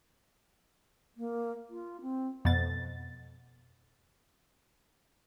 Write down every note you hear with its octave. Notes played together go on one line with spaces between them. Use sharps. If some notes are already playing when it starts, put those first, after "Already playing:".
A#3
F4
C4
F2 B2 A6